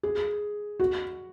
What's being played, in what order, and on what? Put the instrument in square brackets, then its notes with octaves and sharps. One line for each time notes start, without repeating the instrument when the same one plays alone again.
[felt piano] G#4
F#4